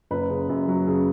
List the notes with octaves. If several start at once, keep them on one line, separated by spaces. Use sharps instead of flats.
F#1 B4
C#3
F#2
F#3
C#3